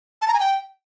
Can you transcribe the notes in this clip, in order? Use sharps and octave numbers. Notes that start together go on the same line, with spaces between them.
A5
A#5
G#5
G5